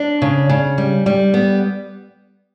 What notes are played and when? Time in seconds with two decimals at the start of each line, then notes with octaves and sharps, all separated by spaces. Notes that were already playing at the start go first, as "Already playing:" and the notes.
Already playing: D4
0.22 C#3
0.49 C#3
0.78 G3
1.06 G3
1.34 B3